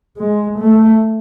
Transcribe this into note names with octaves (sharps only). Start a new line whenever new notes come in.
G#3
A3